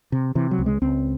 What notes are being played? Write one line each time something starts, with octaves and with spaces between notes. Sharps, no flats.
C3
C3 E3
F#3
C#2
G#3
C#2 C4